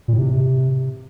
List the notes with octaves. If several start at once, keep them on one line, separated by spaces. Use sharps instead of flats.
A#2
A2
C3